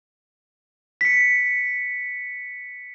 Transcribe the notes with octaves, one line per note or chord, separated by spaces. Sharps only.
B6 C#7